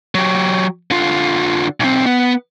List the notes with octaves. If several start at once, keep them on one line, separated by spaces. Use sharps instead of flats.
F#3 G4
D3 F4
B1 C4
B3